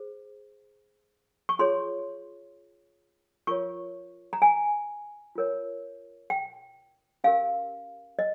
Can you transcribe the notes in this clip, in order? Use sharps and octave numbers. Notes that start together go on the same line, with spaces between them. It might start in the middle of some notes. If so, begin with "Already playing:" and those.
Already playing: G#4 C5
C#6
F4 G#4 C#5 C6
F4 A#4 C#5 C#6
A#5
G#5
F4 A#4 C#5
G5
C#4 G4 A#4 F5
D#5